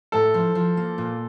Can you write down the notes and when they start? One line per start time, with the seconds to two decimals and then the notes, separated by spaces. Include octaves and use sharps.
0.12 A2 A4
0.34 F3
0.55 F3
0.77 A#3
0.98 A#2